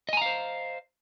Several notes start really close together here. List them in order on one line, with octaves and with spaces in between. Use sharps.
D#5 G#5 A#5 F5 C5